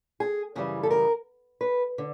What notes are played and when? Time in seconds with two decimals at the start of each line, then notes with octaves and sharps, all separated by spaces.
0.20 G#4
0.55 F#2 C#3 E3 G3
0.83 A4
0.91 A#4
1.61 B4
1.98 D3